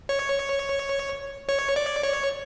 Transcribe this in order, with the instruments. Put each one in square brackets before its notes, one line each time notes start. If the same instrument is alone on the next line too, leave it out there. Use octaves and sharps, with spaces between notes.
[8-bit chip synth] C#5
C#5
D5
C#5